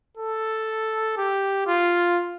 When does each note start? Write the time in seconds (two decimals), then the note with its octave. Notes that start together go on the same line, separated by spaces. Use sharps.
0.17 A4
1.17 G4
1.67 F4